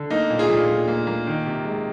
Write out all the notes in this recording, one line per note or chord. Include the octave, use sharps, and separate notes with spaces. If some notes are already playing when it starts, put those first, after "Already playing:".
Already playing: D3
A#3 D#4
A#2
F4 G#4
A#2
A#2
A#3
A#3
D#3
C3
G#3